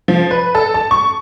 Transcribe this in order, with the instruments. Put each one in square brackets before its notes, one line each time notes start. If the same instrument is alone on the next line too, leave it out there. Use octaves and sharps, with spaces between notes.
[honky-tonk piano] F3
B4
A4
A5
C#6